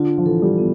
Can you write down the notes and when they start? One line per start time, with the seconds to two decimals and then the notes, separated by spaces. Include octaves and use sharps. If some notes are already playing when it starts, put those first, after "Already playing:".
Already playing: D3 F4
0.18 F3
0.26 E3 A4
0.42 G3
0.58 B3